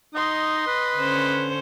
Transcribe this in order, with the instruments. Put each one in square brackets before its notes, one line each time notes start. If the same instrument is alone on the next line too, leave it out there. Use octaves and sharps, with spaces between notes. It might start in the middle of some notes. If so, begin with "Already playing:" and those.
[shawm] D#4 [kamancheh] D#5 C6
[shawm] B4
[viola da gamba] D3 C#4 C5